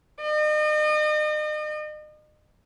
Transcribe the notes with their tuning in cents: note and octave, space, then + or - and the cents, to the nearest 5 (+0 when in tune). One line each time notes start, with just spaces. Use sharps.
D#5 -40